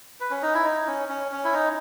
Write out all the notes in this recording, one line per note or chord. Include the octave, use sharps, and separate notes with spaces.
B4
C#4
D#4
E4
D#4
C#4
C#4
C#4
E4
D#4